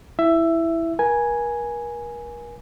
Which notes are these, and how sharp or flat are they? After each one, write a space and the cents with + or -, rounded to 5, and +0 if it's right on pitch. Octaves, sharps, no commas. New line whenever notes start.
E4 +0 E5 +10
A#4 +40 G#5 +0